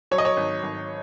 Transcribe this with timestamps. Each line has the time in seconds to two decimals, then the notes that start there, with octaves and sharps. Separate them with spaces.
0.11 F#3 C#5
0.18 D#5
0.25 C#5
0.37 G#1
0.63 G#1